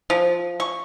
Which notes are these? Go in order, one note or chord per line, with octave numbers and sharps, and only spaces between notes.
F3
C#6